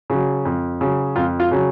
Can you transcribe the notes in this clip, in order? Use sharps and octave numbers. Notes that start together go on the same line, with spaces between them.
C#3 F#3
F2
C#3 F#3
F2 F4
F4
C#3 F#3